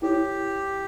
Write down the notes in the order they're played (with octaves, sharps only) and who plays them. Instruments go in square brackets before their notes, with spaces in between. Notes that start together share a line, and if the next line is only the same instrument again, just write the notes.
[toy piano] E4 A4 C#5 [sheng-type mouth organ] G4